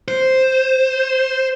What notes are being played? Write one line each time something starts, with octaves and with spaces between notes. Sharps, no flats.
C5